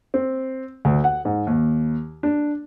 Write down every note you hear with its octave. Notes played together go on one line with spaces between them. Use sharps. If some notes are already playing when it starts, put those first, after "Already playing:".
C4
D2
F#5
G#2
D#2
D4